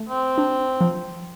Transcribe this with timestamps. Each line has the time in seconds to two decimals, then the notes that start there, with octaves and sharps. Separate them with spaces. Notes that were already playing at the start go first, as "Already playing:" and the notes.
Already playing: A3
0.09 C4
0.38 D4
0.81 F3